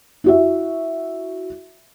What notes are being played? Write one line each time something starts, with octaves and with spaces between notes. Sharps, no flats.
E4 F#4 E5